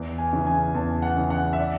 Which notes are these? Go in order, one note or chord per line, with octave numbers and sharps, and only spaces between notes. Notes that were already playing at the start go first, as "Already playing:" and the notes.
Already playing: E2
G#5
C#3 E3
G#5
E2 A5
F#5
C#3 E3
F#5
E5
D5